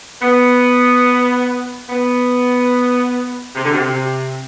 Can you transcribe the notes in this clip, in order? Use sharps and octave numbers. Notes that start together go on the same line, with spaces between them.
B3
B3
C3
D3
C3